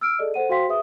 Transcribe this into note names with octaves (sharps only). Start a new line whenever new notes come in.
E6 F6 D7
G#4 A4 D5 D#5
A4 C5 F#5 D#7
F#4 C5 F5 G5 C6 B6
G#4 B4 E5 D#6